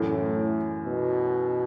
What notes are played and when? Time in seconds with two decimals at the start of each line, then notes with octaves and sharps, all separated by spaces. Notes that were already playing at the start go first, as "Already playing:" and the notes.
Already playing: F#2 A2 E3 A3
0.85 B2